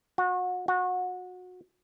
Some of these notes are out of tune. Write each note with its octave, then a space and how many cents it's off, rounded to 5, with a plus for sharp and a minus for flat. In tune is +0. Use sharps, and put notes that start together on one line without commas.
F#4 -30
F#4 -25